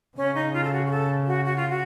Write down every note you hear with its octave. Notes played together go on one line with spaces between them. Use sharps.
C#3 C#4
D#4
F4
A4
F#4
F#4
A4
F#4
F#4
F4
F#4